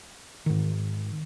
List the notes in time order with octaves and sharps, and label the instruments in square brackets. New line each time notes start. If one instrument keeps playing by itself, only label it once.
[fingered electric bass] G#2 D#3